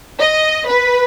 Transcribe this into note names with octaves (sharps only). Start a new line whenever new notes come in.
D#5
B4